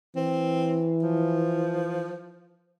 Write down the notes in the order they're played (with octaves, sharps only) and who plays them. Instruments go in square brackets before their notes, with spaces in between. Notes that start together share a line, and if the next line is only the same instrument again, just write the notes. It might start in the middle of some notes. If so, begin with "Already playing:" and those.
[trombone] E3 [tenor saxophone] C4
[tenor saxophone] F3